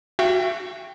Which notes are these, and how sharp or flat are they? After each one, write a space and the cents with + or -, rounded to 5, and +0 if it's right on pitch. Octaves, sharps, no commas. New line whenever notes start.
F#4 -15 E5 +35 G5 +0